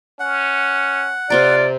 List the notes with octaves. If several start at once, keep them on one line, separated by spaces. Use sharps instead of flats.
C#4 F#5
C3 C4 F4 D5 A#5